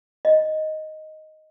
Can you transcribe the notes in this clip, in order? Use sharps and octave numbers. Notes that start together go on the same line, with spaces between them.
D#5